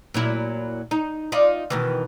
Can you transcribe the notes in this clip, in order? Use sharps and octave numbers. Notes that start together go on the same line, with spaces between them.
A#2 F#3 E4
D#4
D#4 F4 D5
B2 D#3 E3